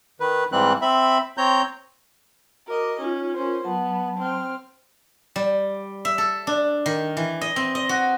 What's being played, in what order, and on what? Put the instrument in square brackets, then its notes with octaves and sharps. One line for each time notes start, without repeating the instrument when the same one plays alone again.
[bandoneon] D#3 B4
G#2 E3 G3 C4 F#6
C4 E5 B5
C4 C#5 A#5 G6
[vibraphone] F#4 D6 [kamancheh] A#4 D#5
[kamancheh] C#4 [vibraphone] D#4 F4
[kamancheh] C#4 C5 [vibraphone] F4 A#4
[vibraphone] F#3 A5 [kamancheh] B3
[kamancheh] C4 F6
[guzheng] G3
E5
A4
D4
D#3
E3
D#5
C4
D#5
F#4